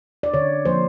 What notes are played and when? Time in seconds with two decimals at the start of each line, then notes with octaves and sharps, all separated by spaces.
0.23 D5
0.34 D3 C#5
0.65 F3 A#3 C5